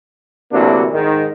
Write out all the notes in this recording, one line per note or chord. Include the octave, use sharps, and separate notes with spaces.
D2 C3 E3 F#3 A#3 D4
G#2 D#3